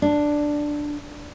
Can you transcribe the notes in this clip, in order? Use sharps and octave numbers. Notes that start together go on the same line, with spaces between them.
D4